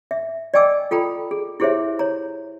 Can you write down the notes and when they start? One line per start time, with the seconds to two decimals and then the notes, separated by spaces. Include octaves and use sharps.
0.11 E5
0.54 D5 D#5 G5 G#5 D6 E6
0.91 F4 A4 G5 A#5 B5
1.31 G#4
1.60 E4 G4 G#4 C5 C#5 E5
1.99 C#5 A#5